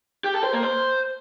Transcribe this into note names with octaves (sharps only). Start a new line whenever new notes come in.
G4
A4
C5
A#3
C5